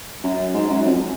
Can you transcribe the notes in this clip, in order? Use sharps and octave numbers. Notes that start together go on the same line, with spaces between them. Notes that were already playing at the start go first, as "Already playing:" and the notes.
F#2
G#2
F#2
F2